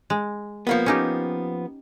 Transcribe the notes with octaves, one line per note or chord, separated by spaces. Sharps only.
G#3
F3 A#3 B3
C#4 D#4 G4